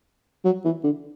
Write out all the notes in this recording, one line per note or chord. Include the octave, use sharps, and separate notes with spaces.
F#3
E3
D3